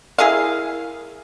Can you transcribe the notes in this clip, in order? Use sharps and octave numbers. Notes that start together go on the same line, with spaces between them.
E4 G#4 A#4 F5